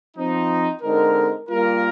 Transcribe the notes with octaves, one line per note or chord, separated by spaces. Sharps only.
F3 C4 D#4
D3 G#3 C4 D#4 A#4
G3 A#3 F4 A#4